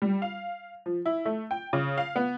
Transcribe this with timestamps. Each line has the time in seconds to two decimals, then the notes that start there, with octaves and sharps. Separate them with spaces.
0.02 G3
0.22 F5
0.86 F3
1.06 E4
1.25 A3
1.51 G5
1.73 C#3
1.98 F5
2.16 B3